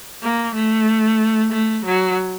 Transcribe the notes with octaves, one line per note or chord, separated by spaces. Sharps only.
A#3
A3
A3
F#3